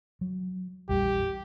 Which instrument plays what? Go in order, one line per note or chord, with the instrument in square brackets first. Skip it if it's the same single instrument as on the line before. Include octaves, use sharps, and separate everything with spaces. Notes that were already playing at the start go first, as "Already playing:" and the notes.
[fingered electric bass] F#3
[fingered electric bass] A#1 E2 G3 [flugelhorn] G4